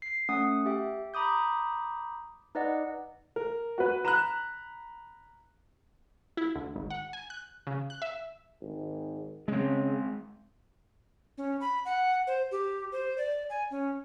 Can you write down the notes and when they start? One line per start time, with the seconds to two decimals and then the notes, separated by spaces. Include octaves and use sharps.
0.02 C7
0.29 A3 C#4 F#5 D#6
0.66 G4 E5 G5
1.14 A#5 B5 D6 D#6 G6
2.55 D#4 B4 D5 D#5 F#5
3.36 A#4
3.78 F#4 B4
4.05 A#5 B5 F#6 E7
6.37 E4
6.55 D2
6.76 G#1
6.90 F#5
7.13 G#5
7.30 F#6
7.67 C#3
7.90 F#6
8.02 E5
8.61 G#1
9.48 C#3 G#3 C4
11.38 C#4
11.61 B5
11.85 F#5
12.27 C5
12.51 G4
12.92 C5
13.18 D5
13.50 G#5
13.71 C#4